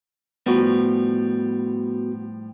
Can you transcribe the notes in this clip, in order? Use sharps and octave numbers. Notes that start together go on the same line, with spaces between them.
A2 F3 G3 B3 F#4